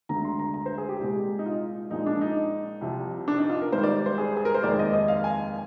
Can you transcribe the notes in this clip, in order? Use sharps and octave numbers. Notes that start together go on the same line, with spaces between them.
D2 D3 G#3 A#5
C6
A#5
A#5
C5
G#4
G4
C2 A#2 G#3
D#4
F4
A#1 A#2 F3 G#3 D#4
D4
D#4
C2 C3 F3
D4
D#4
F4
A#4
G#1 G#2 G3 C5
D5
C5
G#4
G#4
A#4
C5
F1 D#2 D#3 G#3 D5
D#5
D#5
F5
G#5